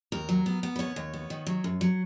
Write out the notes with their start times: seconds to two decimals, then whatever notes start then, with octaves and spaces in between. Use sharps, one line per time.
0.12 D#2 A#4
0.29 F#3
0.46 B3
0.63 B3
0.76 B4
0.79 D#2 C#5
0.96 D#2
1.14 B3
1.30 D#3
1.47 F#3
1.64 F#2
1.81 F#3